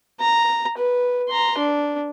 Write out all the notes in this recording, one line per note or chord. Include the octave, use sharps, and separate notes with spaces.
A#5
B4
A#5 C6
D4